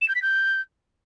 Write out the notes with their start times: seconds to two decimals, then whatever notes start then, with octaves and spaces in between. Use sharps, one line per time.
0.01 E7
0.08 G6
0.15 B6
0.22 G6